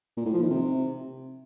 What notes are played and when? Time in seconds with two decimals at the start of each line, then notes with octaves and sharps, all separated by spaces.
0.17 A#2
0.26 A2
0.34 F3
0.42 D#3
0.50 C3